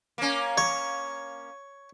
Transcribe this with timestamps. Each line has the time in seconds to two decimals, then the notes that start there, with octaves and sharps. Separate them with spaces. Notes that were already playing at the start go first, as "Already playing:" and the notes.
0.18 A#3 C#4
0.58 C#5